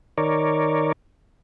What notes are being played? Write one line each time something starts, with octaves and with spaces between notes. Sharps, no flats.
D#3 A#4 C#5 D5